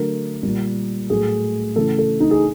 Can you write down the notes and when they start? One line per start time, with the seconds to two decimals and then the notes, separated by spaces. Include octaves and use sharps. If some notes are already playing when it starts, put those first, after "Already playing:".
Already playing: D3 F#3 A3 A#4
0.43 A#2 G3
1.10 A2 F#3 A3 G#4
1.76 C#3 E3 A3 A4
1.98 A4
2.20 D#4
2.31 G#4